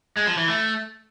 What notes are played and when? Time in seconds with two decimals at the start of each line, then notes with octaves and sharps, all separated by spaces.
0.17 G#3
0.27 F3
0.37 E3
0.48 A3